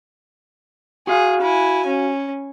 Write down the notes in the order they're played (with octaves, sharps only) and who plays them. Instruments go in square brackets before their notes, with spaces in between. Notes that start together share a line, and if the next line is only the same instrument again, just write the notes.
[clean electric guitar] F#4 F5 [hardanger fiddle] G#4
[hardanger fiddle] E4 G#5
C#4